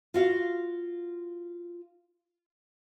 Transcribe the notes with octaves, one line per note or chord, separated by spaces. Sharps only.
F4 F#4 F5